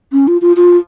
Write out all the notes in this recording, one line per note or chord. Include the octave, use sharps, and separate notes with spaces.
C#4
F4
F4
F4